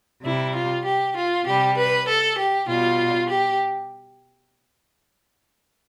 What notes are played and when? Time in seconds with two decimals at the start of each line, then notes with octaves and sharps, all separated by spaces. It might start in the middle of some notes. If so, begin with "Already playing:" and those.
0.24 C3 G3 E4
0.54 F4
0.85 G4
1.16 F4
1.46 C3 G3 G4
1.76 B4
2.07 A4
2.37 G4
2.68 B2 G3 F4
3.29 G4